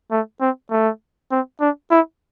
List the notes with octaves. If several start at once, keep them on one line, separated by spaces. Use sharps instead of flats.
A3
C4
A3
C4
D4
E4